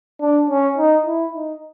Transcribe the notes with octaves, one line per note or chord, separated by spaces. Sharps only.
D4
C#4
D#4
E4
D#4